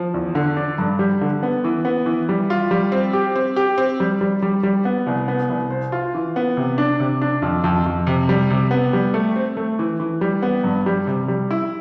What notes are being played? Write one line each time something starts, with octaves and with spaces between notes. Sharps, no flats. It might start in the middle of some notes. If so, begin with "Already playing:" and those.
Already playing: F3
E2
D3
D4
G2
G3
D3
B3
E3
B3
E3
G3
F4
G3
C4
G4
C4
G4
C4
G3
G3
G3
G3
B3
C2
B3
C2
C5
F4
E3
B3
C3
D4
C3
D4
F2
F2
F2
C3
G3
C3
B3
G3
A3
C4
A3
E3
E3
G3
B3
G2
G3
C3
G3
E4